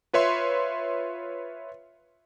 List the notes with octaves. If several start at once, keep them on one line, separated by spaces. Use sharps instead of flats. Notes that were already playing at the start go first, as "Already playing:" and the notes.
F4 B4 C#5 E5 C6